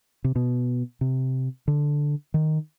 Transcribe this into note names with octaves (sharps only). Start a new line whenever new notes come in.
C3
B2
C3
D3
D#3